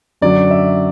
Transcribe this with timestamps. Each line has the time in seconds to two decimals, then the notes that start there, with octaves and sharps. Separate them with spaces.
0.21 F#2 D3 F#3 D5
0.51 E5